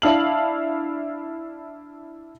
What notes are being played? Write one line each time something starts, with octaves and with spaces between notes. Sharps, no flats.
D4 E4 F5 F#7